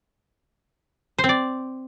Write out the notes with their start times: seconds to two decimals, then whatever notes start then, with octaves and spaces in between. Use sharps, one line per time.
1.18 C5
1.24 C4
1.29 D5